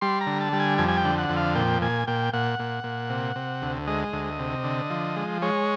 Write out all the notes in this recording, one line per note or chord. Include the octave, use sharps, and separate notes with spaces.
G3 C6
A#5
D3
A5
G3
G#5
F2 G#5
G#5
G5
D3
F#5
F2
F5
A#2 G5
A#2 G#5
A#2 G5
A#2 F#5
A#2
A#2
C3
C3
D2
G#3 D#5
D2
C3
D3
F3
G#3
G#3 C#5